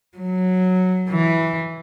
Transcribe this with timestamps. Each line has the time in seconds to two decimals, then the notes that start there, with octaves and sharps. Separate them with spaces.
0.18 F#3
1.09 E3